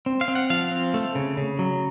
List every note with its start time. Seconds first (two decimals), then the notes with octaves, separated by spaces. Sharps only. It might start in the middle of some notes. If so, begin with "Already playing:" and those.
0.06 C4
0.21 F5
0.28 C4
0.35 F#5
0.50 F3 F5
0.71 C4
0.94 A3
1.15 C#3
1.37 C#3
1.59 F#3